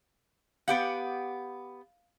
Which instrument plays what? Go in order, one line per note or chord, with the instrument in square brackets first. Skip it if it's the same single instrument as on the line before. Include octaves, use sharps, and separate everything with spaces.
[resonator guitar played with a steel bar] B3 G4 F#5 [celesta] F5 D7